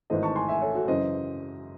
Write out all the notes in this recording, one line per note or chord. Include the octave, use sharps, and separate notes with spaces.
G#1 G#2 E3 A3 C5 D#5
A5 C#6
G#5 C6
E5 G#5
A4 C#5
F#4 A4
F#2 C#3 E3 C5 D#5